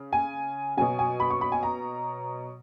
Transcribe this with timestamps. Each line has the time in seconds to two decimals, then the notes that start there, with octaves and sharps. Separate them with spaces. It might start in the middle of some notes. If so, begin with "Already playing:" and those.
Already playing: C#3
0.13 G#5
0.77 B2 F#3 G#5
0.99 G#5
1.20 B5
1.30 C#6
1.41 B5
1.52 G#5
1.63 A#5